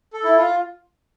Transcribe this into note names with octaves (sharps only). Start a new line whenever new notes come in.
A4
E4
F4